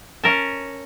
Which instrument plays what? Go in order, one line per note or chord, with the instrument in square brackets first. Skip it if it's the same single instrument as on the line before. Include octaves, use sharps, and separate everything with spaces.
[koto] C#4 A#4 A5